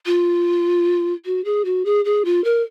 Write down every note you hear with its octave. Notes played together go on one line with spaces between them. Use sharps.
F4
F#4
G#4
F#4
G#4
G#4
F4
A#4